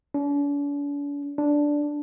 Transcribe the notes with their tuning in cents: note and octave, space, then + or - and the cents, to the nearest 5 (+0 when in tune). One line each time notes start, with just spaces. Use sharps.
D4 -45
D4 -5